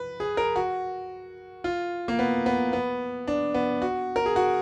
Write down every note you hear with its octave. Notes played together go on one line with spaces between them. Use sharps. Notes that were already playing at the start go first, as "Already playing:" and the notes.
Already playing: B4
G#4
A#4
F#4
F4
A#3
B3
B3
B3
D4
B3
F#4
A#4
G#4
F#4